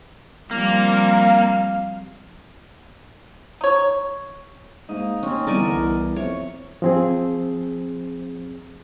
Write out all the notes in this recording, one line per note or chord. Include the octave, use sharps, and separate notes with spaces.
F3 G3 A#3 C4 F5
D#4 C#5
G#2 A#3 D#4
D#2 C4 C#4
E2 G3 A#4 D5 G#5
D3
C2
F2 E4 C#5
F3 C4 G#4